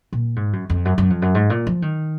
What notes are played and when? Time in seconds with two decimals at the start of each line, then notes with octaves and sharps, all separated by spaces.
0.13 A#2
0.36 G#2
0.53 F#2
0.70 F2
0.85 F#2
0.98 F#2
1.10 F2
1.22 F#2
1.35 G#2
1.50 A#2
1.67 F3
1.82 D#3